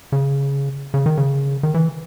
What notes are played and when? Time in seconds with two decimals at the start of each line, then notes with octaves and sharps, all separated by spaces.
0.12 C#3
0.94 C#3
1.06 D#3
1.17 C#3
1.63 D#3
1.74 E3